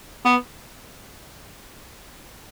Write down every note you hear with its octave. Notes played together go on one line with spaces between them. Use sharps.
B3